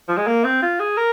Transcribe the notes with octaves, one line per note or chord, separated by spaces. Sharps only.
F3
G#3
A#3
C4
F4
G#4
A#4